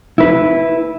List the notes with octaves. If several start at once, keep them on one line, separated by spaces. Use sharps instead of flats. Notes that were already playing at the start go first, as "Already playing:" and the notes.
E4 B4